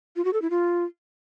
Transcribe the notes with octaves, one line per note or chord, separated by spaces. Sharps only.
F4
F#4
A4
E4
F4